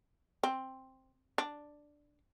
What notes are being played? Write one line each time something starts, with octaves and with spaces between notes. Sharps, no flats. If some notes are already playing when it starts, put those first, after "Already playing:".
C4
D4